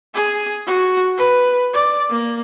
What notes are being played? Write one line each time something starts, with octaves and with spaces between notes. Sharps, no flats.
G#4
F#4
B4
D5
A#3